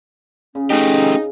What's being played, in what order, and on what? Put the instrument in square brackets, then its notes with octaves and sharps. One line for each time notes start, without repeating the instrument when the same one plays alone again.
[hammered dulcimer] C#3 [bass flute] C#4
[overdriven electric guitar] A3 G4 [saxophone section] D#4